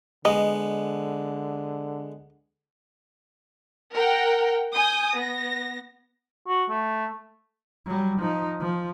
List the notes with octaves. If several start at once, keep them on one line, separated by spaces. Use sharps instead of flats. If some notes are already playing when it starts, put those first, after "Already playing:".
D3 G#3 B3 D#5
A#4 F#5 G5
G#5 D#6 G6
B3 A#6
F#4
A3
F#3 G3
F3 D#4
F3